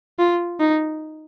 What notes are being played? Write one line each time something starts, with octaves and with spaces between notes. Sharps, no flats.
F4
D#4